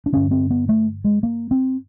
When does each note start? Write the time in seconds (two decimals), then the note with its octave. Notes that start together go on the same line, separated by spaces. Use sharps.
0.06 D4
0.13 G2 D3 C#4
0.31 C4
0.50 B3
0.69 A3
1.04 G#3
1.23 A#3
1.51 C4